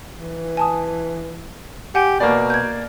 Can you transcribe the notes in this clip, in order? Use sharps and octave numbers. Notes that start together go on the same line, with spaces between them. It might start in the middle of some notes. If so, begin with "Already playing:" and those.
E3
G#5 A5 D#6
G4 F#5 G#5
B2 A#3 D5
G6 G#6